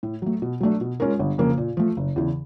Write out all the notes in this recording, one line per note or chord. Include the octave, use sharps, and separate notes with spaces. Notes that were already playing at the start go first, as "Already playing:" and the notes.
A2
F#3 A3
B2
F#3 A3 D4
B2
G#3 C#4 F4 A#4
G1
F2 C#3 F3 A#3
A#2
F3 A3
F#1
E2 C#3 E3